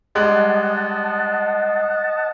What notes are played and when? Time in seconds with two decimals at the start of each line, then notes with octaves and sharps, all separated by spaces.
0.15 G3 G#3 D#5 F#5 A5 F#6